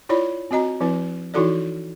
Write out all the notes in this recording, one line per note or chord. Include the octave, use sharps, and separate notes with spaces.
E4 F4 C#5 D5 B5
C4 F#4 D#5 A#5
F3 C4 E4 B4
E3 D#4 E4 F#4 A4 D5